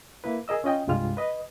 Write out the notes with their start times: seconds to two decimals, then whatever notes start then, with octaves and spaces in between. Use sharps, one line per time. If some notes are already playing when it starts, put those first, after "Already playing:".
0.24 A#3 E4 B4
0.48 G#4 A#4 D#5 E6
0.64 C#4 F4 D#5 G5
0.87 C2 G2 G3 G#3 F4 F6
1.17 B4 D#5